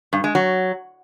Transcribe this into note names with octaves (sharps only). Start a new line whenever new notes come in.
G2
G#3
F#3